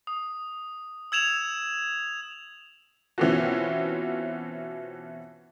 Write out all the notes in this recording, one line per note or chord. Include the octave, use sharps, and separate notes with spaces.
D#6
E6 G#6 E7 F7
B2 E3 C4 C#4 F4 F#4